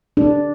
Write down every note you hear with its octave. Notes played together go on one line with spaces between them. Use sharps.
D4